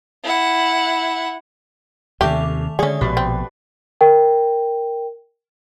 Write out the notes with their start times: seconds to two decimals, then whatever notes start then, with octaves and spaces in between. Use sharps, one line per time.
0.24 E4 F#5
2.21 D#2 C3 D#3 A3 G4 D6 F7
2.79 D3 D#3 G#3 C#4 G#4 D5 D#6
3.01 A#1 B2 F#4 G4 B4 D5 F#5
3.17 C4
4.01 A#4 G5